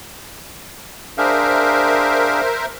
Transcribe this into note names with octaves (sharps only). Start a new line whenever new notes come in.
D4 G#4 A#4 C5 E5 F5